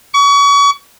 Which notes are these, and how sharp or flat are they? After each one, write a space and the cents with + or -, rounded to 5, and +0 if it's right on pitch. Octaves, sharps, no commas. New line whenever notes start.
C#6 +35